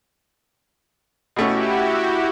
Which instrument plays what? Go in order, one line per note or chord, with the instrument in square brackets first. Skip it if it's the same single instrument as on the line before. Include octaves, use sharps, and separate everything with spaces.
[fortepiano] B2 A3 C#4 [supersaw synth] E4 F#4 G4